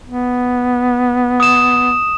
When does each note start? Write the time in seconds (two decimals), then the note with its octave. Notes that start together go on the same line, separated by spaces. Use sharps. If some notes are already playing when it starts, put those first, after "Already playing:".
0.06 B3
1.40 D#6 E7